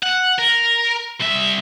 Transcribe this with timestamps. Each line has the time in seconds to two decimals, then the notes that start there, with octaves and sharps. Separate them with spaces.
0.03 F#5
0.39 A#4
1.20 C2 E5